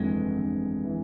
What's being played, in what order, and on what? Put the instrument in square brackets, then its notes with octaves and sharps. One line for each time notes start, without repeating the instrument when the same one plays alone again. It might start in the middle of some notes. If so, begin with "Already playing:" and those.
Already playing: [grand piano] G1 F2 E3 [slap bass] G#3 C4
[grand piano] G1
E3